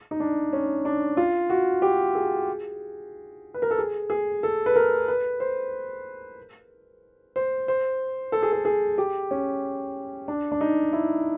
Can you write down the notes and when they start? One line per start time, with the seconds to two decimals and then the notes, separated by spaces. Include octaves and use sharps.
0.11 D#4
0.20 D4
0.53 C#4
0.85 D4
1.17 F4
1.50 F#4
1.82 G4
2.15 G#4
3.54 B4
3.62 A#4
3.71 A4
3.78 G#4
4.10 G#4
4.43 A4
4.66 B4
4.76 A#4
5.08 B4
5.40 C5
7.36 C5
7.68 C5
8.32 A4
8.43 G#4
8.52 A4
8.65 G#4
8.98 G4
9.31 C#4
10.28 D4
10.52 D4
10.61 D#4
10.93 E4